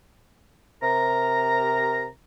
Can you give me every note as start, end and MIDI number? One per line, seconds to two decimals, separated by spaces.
0.83 2.08 48
0.83 2.08 70
0.83 2.08 82